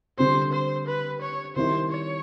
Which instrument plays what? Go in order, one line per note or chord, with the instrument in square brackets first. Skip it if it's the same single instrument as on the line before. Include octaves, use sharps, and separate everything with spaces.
[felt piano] D3 G3 C4 [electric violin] C5
[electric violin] C5
B4
C#5
[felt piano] D#3 G3 C4 E4 [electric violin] C5
[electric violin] C#5